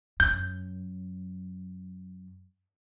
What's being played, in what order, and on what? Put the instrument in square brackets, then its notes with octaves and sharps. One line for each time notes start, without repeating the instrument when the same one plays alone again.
[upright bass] F#2 [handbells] G6